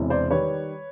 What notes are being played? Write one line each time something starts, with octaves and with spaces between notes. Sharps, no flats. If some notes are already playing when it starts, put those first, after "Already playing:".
Already playing: E1 E2 C3 E3
C5 D5
D#3 G3 B4 C#5